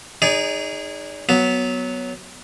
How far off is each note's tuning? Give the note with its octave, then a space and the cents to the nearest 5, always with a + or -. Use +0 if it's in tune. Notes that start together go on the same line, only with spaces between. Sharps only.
D#4 +0 G#4 -15 D5 -45
F#3 +0 B3 +0